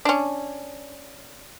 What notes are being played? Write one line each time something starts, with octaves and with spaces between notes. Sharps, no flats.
C#4 D4